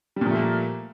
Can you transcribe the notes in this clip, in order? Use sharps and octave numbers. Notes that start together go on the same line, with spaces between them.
A#2 F3 G3 A3 A#3